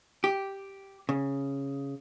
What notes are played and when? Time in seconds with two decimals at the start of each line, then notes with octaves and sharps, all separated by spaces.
0.24 G4
1.09 C#3